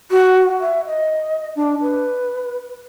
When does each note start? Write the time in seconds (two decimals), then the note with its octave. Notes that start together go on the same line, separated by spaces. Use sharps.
0.11 F#4
0.60 E5
0.86 D#5
1.56 D4
1.81 B4